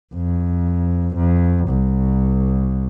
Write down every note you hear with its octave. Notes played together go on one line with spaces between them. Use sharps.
F2
F2
C2